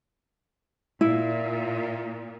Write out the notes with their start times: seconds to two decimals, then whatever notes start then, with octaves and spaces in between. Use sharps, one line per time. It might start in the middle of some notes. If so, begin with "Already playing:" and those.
1.01 A#2 E4